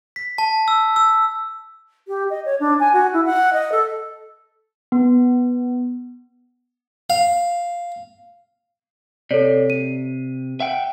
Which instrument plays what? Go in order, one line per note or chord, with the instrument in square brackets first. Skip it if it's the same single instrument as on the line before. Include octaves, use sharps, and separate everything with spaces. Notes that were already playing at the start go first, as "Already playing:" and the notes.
[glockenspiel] B6
A5
E6
E6
[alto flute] G4
D#5
C#5
D4
G#5
F#4
E4
F#5
D#5
A4
[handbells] B3
[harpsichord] F5
[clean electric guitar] C3 [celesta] A4 C#5 D5
[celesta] D#7
[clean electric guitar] E5 F#5 G5